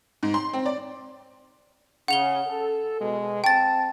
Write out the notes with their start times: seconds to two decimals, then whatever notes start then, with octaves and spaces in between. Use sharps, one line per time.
0.23 G#2
0.34 C6
0.53 C4
0.66 D5
2.08 C#3 F#5 F7 G7
2.47 A4
2.99 B2 G#3
3.44 C4 G5 A5 A6